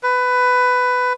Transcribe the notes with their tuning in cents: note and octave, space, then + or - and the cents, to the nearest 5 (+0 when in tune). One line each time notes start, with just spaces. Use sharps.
B4 +15